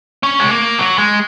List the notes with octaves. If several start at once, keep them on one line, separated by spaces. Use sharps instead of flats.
C#4
G#3
A#3
F#3
G#3